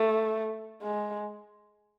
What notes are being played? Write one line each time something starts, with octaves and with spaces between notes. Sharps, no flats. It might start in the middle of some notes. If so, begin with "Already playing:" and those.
Already playing: A3
G#3